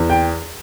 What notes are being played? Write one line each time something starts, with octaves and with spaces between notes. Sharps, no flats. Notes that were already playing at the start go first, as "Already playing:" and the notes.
Already playing: E2
G5